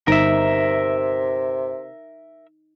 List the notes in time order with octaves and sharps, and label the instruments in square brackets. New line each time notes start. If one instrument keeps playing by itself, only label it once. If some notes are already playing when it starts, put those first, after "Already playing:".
[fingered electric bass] G1 [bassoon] C3 [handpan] D#4 [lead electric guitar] A#4 E5